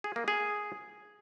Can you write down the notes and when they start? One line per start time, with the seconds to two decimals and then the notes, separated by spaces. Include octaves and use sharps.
0.04 G#4
0.16 A#3
0.28 G#4